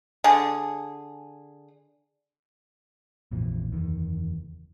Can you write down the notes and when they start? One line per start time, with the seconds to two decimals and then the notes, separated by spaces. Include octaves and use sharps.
0.24 D3 G#4
3.31 A#1 F2 A#2 E3
3.72 F#1 E2 D#3